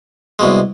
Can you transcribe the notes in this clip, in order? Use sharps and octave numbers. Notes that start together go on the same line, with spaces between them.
C2 B2 G#3